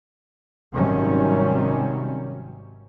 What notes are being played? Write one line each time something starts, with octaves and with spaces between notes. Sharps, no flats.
G#1 C3 D#3 F#3 G3 C#4